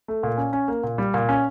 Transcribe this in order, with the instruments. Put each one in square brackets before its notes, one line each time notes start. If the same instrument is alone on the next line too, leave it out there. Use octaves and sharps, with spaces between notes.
[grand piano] A3
A#2
C#4
C#4
A#3
A#2
G3
A#2
C#4